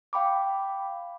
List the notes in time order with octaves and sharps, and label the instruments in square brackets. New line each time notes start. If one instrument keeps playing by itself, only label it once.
[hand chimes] F5 G5 B5 D6